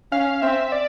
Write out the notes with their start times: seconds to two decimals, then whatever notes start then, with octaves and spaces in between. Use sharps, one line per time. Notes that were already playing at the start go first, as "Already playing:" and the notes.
0.12 C#4 F5
0.42 C4 E5
0.72 D5